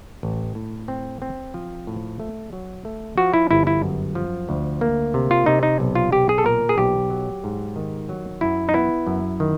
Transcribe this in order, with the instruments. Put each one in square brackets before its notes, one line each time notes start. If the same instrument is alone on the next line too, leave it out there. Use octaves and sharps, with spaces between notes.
[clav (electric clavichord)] A1
A2
C4
C4
F3
A2
A3
F#3
A3
F3 F#4
E4
G1 E4
E4
F#2
F3
D2
A#3
C3
F4
C3 D#4
D#4
B1
F4
B1 G4
G#4
A4
A#2 A#4
G#4
B1 G4
F#3
G#2
D#3
F#3
F#2 E4
D#4
B3 E4
F#2
D#3